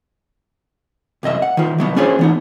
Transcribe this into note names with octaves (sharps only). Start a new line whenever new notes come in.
C2 F#2 D#5 E5
F#5
D#3 F4
C2 F#3 B3
C#4 D4 F4 G#4 C5 C#5
E3 B3 D#4